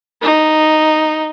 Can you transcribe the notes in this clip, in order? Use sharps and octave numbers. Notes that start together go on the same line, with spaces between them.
D#4